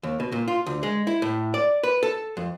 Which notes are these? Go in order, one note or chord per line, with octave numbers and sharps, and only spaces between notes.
D#2
B2
A#2
F4
D2
G#3
E4
A2
D5
B4
A4
F2